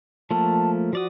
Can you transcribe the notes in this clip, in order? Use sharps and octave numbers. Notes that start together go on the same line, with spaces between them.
F3 A3 A#3 A5
F3 F#4 D5 D#6